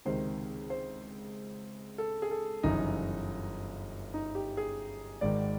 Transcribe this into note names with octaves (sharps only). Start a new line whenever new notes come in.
C#2 C3 D#3 C5
C5
A4
G#4
A4
G1 F#2 C#3 E3 D#4
D#4
G4
G#4
G#1 G#2 D#3 D5